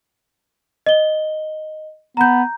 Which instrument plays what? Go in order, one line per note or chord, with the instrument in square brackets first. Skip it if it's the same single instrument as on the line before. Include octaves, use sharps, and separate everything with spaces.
[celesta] D#5 G7
[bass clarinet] B3 [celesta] A#5 G6